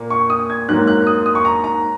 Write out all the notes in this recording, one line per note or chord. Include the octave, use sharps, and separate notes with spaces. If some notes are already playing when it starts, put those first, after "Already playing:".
Already playing: A#2 A#3
C#6
D#6
G#6
G#2 F#3 A#3 F#6
F#6
D#6
D#6
C#6
A#5
A#5